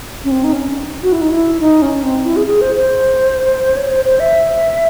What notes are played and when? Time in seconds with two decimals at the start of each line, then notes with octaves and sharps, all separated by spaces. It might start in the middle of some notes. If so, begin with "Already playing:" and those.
0.25 C#4
0.31 C4
0.44 D#4
0.53 C#4
1.03 F#4
1.12 E4
1.21 D#4
1.30 E4
1.60 D#4
1.82 C#4
2.03 C4
2.25 E4
2.36 G#4
2.47 G#4
2.61 C5
2.76 C5
3.77 C#5
3.90 C5
4.05 C5
4.20 E5